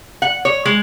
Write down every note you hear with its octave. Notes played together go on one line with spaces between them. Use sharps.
F#5
C#5
G#3